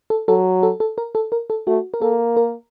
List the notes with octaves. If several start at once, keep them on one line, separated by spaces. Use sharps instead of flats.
A4
F#3 A4
A4
A4
A#4
A4
A#4
A4
A3 F#4
A#4
A#3 A4
A#4